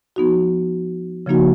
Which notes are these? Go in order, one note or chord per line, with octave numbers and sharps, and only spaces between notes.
F3 B3 D#4 F#4
C#3 F3 A#3 D#4 F#4